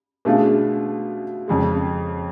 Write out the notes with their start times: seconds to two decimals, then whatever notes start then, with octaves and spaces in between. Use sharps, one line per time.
0.25 B2 A3 D4 F4 G#4
1.48 F2 C#3 G#3